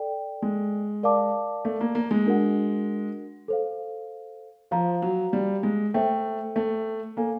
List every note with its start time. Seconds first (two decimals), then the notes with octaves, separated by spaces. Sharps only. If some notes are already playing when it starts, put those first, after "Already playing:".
Already playing: A4 D5 G5
0.42 G#3
1.03 A#4 D5 F5 A5 D6
1.65 A3
1.81 A#3
1.95 A#3
2.11 G#3
2.26 D4 F#4 A#4 D#5 F#5
3.48 A4 C5 F5
4.71 F3 C5 F5 A#5
5.02 F#3
5.33 G3
5.63 G#3
5.94 A3 A4 C5 E5 G5
6.56 A3
7.17 A#3 A4 C#5 F5 G#5